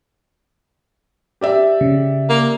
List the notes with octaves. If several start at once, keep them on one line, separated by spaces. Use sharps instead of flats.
G4 D5 E5
C#3
A#3